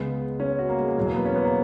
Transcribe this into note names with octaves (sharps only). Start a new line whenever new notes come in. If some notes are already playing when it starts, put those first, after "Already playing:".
Already playing: C#2 C#3 G#3 B3
C#4
F#4
A#3
G#3
A#3
E2 B2 F#3 G#3
A#3
B3
C#4
B3
A#3